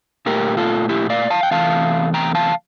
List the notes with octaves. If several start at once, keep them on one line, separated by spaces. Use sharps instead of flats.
A#2 A3 G4 A#4
F4 A4
E4 G4
D5 F5
F5 A5
G5
E2 C3 E3 A3 F5 A5
G5 A#5
F5 A5